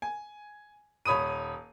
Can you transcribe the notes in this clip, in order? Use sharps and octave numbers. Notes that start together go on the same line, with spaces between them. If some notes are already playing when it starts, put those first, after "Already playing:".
G#5
D#1 C#5 B5 D#6 D#7